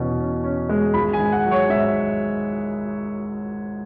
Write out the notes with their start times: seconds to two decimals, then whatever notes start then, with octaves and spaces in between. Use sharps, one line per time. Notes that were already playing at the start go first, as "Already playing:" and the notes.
Already playing: E2 B2 C#4
0.18 C#4
0.44 C#4
0.69 G#3
0.94 G#1 B5
1.13 G#5
1.19 G#2
1.32 F#5
1.45 F#3
1.51 C#5
1.69 G#2 E5